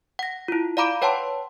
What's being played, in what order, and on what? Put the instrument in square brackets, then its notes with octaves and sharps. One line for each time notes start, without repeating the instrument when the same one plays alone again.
[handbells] F#5 A#6
E4 F4
D5 F5 A#5 B5 D6 D7
B4 C#5 F#5 G5 A5 C6